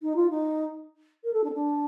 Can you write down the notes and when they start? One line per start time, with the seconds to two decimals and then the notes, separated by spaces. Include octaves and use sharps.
0.02 D#4
0.16 F4
0.30 D#4
1.24 A#4
1.33 A4
1.44 D4
1.49 C4
1.54 D4